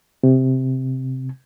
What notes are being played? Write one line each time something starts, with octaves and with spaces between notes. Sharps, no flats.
C3